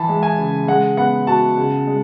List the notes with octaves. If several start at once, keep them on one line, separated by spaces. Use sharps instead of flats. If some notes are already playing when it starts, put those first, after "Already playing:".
Already playing: E3 A5 B5
G#3
G#5
C#3
G#3 F#5
B3 F#5
F#4 A5
C#3
G#3